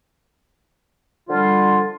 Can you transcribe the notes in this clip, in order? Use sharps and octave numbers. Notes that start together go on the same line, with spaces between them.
D3 F3 G3 F4 C6